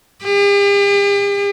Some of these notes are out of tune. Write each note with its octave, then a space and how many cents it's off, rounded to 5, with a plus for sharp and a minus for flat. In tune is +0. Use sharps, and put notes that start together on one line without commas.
G4 +45